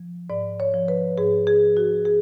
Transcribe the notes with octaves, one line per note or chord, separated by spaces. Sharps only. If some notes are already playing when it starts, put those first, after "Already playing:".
Already playing: F3
G#2 D5
C#5
F3
B4
G#2 G#4
G#4
F3
F#4
G#4